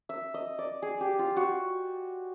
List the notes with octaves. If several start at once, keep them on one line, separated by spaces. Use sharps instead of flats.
E5
D#5
D5
G#4
G4
F4
F#4